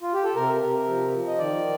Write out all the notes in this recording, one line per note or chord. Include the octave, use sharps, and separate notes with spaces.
F4
G4
A4
C3 A#4
C3
F3
F3
D#5
D#3 D5